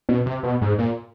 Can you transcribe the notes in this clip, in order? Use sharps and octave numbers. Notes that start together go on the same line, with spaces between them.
B2
C3
B2
G#2
A#2